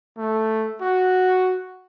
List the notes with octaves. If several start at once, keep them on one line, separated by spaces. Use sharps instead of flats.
A3
F#4